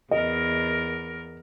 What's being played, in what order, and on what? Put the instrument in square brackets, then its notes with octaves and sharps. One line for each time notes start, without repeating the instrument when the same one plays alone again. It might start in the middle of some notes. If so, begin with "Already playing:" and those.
[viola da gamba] E2 A#4 [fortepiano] D#5